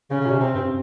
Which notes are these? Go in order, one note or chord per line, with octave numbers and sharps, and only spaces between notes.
C#3 C#4
C#3
A#2
C3
C3 C4
G2